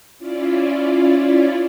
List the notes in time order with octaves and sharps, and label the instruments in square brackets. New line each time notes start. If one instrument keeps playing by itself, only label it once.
[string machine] C#4 E4 F4 D5